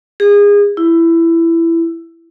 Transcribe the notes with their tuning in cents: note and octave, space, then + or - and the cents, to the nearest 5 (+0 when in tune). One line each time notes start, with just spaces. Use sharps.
G#4 -25
E4 +15